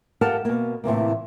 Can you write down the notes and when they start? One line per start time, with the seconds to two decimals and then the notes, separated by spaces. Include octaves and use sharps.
0.21 G4 A4 A#4 F5 F#5 A5
0.45 B2 A#3
0.84 A2 C3 E3 A#3